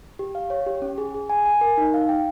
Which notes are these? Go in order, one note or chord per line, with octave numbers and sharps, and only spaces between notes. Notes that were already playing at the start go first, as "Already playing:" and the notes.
G4
F5
C#5
G4
C#4
G#4
G#4
G#5
G#5
A#4
D#4
F5
G5